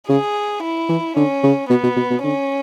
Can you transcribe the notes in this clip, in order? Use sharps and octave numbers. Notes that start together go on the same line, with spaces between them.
C#3 G#4
E4
E3
D3 C#4
C#3
B2 B3
B2
B2
B2
D3 C#4